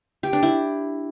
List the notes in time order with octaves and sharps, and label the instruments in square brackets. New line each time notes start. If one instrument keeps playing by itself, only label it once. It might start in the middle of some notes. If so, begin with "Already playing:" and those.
[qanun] G4
D4
E4